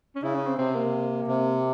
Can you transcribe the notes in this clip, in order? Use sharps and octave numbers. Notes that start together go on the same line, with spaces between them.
C#4
C#3 E4
C#4
C4
C3 C4
A#3
C3